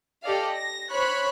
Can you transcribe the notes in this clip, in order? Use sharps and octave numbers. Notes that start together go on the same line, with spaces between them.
G4 A4 D5 D#5 F5
A#6
C5 C#5 B5 C#6 F#6